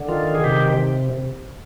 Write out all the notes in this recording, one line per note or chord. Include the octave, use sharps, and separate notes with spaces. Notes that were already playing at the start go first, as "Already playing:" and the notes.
Already playing: D3
D#3 F4
G#4
C3 G4